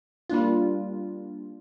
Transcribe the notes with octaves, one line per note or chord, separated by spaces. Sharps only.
G3 A#3 D4 F4